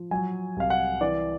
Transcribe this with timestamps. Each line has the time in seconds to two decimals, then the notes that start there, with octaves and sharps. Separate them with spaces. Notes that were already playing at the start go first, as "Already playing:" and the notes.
Already playing: F3
0.11 F#3 G#5
0.56 C2 F5
0.70 F#5
1.01 E3 D5